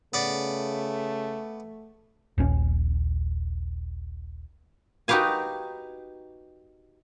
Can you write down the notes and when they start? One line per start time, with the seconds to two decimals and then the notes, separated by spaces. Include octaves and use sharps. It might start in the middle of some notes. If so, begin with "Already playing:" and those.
0.14 C#3 A3 B3 D5
2.38 D#1 A#1 C#4
5.08 D#4 F#4 G4 B4 F5 G#5